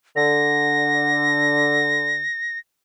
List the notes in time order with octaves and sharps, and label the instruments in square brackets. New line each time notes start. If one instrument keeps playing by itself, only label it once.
[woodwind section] D3 [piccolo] A#6